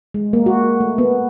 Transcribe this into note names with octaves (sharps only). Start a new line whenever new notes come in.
G#3
A#3
F#4
A3
B3